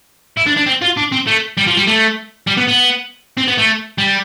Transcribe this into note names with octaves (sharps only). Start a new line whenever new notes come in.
E4
D4
D4
C4
F4
D4
C4
A3
G3
F3
G3
A3
G3
B3
B3
C4
B3
A3
G3